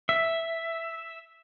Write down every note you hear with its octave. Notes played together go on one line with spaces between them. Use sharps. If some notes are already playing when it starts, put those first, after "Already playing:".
E5